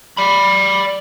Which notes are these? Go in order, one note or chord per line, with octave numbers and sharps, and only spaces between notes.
D5 B5